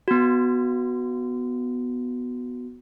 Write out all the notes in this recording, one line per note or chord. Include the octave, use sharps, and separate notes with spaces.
B3 F#4